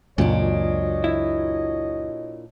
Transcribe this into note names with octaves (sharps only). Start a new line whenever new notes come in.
C#2 F#2 A#2 D4 F#4 C#5 D#5
E4